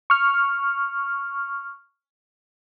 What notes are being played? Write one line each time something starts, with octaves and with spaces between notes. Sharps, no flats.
C#6 F6